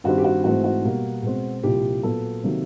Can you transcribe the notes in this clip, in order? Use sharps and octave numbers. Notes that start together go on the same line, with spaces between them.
G2 D#3 G3 C4 F#4
G4
F#4
G#2 E3 A3 C4 F#4
F#4
B2 G3 A#3
B2 G#3 C4
C2 A#2 F3 G4
A#2 F#3 B3 A4
C3 D#3 F#3 A#3